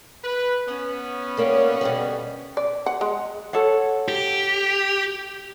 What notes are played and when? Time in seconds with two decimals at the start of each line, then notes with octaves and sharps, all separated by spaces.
0.24 B4
0.68 B3 C#4
1.37 G3 A#3 C#5
1.81 B2 D3 G3
2.57 D5
2.86 F#5
3.01 G#3
3.53 A4 C#5 F#5
4.08 G4